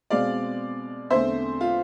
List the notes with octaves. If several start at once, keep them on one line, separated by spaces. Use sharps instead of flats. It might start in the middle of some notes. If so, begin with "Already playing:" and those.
B2 G#3 C4 D5 F5
E2 D3 A3 C4 C5 E5
F4